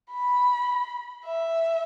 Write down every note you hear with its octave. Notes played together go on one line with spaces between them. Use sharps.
B5
E5